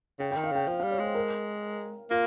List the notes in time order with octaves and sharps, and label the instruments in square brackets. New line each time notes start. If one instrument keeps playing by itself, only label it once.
[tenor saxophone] C#3 [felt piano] G5
[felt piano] G5
[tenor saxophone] D#3
[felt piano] F5
[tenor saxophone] C#3 [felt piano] G5
[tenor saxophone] F3 [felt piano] F5
[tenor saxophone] G3 [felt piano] F5
[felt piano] C#5
[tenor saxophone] G#3 [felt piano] C5
[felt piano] A#4
[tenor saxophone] A#3 [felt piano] F4